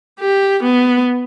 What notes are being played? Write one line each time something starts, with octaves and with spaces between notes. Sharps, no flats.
G4
B3